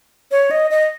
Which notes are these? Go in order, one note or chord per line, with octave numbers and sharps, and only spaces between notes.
C#5
D#5
D#5